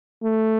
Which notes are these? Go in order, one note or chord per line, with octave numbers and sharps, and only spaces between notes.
A3